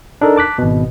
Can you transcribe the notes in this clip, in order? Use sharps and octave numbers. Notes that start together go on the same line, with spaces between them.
D4 D#4 A4 A#4
A5 D6 F#6 B6
G#1 B2